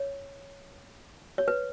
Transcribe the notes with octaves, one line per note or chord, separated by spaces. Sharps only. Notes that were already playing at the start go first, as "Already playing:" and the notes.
Already playing: C#5
C#5
B4